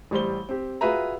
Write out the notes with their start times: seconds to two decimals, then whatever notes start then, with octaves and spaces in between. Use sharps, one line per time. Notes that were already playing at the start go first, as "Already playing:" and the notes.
0.11 A1 G3 C5 G7
0.49 C4 G4
0.81 F4 F#4 G#4 B4 E5 A#5